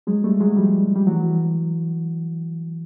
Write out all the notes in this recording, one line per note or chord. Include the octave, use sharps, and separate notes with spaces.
F#3 G#3
G3 A3
F#3 G#3
F3 G3
G3
E3 F#3